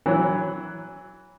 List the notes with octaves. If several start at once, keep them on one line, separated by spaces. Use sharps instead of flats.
E3 F#3